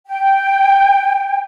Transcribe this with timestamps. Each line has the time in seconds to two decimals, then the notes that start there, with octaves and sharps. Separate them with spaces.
0.07 G5